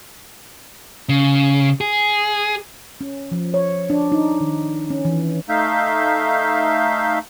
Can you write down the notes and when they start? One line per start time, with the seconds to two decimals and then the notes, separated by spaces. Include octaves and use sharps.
1.09 C#3
1.81 G#4
3.01 C#4
3.31 F3
3.54 C#5
3.90 D4
4.12 D#4
4.40 D#3
4.90 C#4
5.05 E3
5.49 A3 D#4 E5 F5 G6